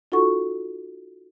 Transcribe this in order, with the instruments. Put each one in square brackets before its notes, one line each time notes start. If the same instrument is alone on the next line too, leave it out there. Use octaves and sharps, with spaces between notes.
[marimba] D#4 F4 F#4 A4 F#5 C#6